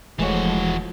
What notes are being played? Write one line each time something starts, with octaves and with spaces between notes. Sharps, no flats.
E1 E3 F3 G#3 A3 F#4 C#5